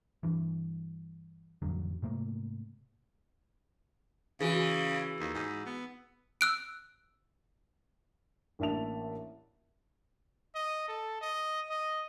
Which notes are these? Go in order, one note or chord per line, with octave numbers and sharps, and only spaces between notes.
G2 E3
A1 F2 D3 F#3
G#2 C3 A3 A#3
C#3 E3 F#4 G#4
D#2
G#2
B3
E6 F#6 D7
A1 A#3 D4 E5 A5 F7
D#5
A4
D#5
D#5